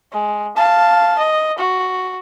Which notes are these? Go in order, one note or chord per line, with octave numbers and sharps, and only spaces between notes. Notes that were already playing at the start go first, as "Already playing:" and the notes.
G#3
F5 A5
D#5
F#4